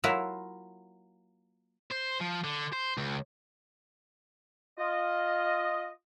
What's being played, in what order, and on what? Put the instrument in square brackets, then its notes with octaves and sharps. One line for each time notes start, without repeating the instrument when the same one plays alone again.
[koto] F#3 A#3 E4 F4 E5
[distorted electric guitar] C5
F3
D3
C5
C#2
[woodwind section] F4 D#5